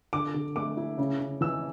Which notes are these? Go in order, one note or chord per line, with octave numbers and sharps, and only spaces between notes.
D3 D6
D3
A3 D6
E4
C#3
C#3
E3 E6